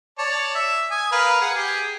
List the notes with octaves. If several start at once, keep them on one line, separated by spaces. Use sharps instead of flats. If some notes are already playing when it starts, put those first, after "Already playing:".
C#5 D5 A5
E5
G#5 D#6
A#4 B4 F5
G#4 F#5
G4 G#4